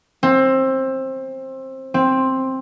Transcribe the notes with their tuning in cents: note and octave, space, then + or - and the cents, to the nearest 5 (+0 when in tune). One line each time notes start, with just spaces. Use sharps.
C4 +20
C4 +10